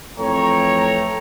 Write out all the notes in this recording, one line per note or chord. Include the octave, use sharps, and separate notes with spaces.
F2 E3 A3 C#5 G5 A#5